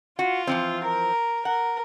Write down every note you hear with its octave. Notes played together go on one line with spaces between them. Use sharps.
F4 F#4
E3 F3 C4
A#4
A#4 F#5